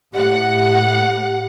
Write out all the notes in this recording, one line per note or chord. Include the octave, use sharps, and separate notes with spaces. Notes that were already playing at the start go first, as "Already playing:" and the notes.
A2 G4 F#5